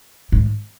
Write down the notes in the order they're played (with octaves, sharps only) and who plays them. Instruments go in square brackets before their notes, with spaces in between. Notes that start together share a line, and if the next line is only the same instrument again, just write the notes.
[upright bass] G#2